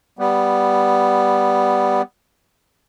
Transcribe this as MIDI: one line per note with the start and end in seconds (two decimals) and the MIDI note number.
0.19 2.02 55
0.19 2.02 59